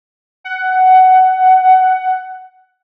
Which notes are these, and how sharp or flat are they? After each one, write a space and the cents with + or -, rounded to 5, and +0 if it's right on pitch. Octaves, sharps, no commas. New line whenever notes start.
F#5 +15